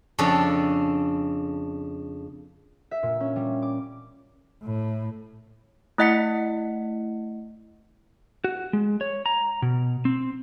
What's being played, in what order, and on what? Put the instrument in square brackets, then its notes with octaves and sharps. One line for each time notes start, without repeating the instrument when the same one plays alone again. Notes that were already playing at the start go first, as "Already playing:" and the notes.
[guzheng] F2 C#3 C#4 D4 A4
[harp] E5
A#2
C#4
G3
D6
[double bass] A2
[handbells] A3 E4 D#5 F#5 B6 C#7
[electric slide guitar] F#4
G#3
C#5
A#5
B2
C4